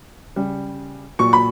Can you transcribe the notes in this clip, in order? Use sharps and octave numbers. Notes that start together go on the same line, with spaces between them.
C#3 G3
A#2 F#3 C#6
B5